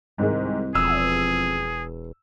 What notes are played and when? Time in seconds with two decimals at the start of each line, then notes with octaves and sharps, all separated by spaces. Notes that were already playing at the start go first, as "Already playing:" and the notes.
0.18 C2 G#2 D#3 G#3
0.75 E1 F2 G#4 E6